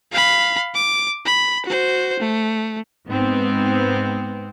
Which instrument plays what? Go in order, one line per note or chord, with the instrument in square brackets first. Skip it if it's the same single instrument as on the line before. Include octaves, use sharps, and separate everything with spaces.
[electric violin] F5 B5
D6
B5
F#4 C5
A3
[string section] G#2 B3 C4